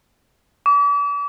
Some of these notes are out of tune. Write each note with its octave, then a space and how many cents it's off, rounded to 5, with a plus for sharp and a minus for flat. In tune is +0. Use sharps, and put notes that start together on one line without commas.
D6 -40